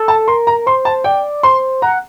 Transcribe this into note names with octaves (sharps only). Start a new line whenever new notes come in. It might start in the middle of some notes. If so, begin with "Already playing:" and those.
Already playing: A4
A5
A#4 C6
A#5
C5 C6
A5
D5 G5
C5 C6
F#5 A#5